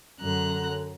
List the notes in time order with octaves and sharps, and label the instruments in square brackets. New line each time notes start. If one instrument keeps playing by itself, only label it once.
[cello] F#2 [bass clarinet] D3 [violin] A#5 F#6